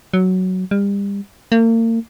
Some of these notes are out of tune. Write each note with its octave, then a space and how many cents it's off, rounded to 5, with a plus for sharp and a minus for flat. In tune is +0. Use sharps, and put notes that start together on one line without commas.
F#3 +5
G3 +35
A#3 -40